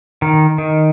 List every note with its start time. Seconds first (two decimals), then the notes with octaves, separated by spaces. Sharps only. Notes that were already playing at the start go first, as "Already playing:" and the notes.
0.22 D#3
0.58 D#3